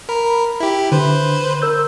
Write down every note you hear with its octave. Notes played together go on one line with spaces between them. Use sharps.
A#4 B5
E4 G4
D3 B4 C5
A#4 E6 G6